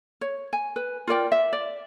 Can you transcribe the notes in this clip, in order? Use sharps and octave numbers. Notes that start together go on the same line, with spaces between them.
C#5
G#5
B4
F4 A#4 D5 G5
E5
D5